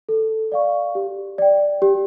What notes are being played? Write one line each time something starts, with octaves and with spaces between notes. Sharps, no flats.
A4
D5 F5 C#6
G4
D5 G5
G4